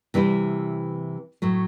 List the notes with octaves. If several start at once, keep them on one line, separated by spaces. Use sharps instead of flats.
C3 E3 G3 C4 E4
A2 F#3 A3